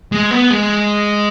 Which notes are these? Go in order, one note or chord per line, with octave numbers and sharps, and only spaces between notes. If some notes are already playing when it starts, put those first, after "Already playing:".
G#3
B3
G#3